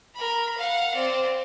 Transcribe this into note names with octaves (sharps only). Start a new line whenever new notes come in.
A#4 B5
F5 F#5
C4 D5